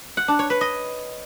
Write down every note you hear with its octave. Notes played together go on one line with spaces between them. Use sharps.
F#5
D4
C#5
B4
D#5